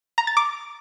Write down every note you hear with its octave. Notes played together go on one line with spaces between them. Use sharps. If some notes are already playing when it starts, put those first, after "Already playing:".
A#5
A6
D6